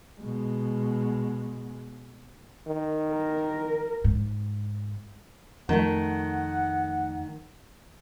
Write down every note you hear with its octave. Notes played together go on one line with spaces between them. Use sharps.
B2 G#3
D#3
A#4
G#2
F2 D#3 A3 F#5